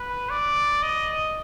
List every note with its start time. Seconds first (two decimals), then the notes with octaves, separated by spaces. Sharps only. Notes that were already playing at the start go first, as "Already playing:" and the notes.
Already playing: B4
0.30 D5
0.83 D#5